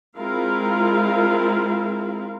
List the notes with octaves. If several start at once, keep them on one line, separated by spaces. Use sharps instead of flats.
G#3 C4 E4 F4 A#4 F5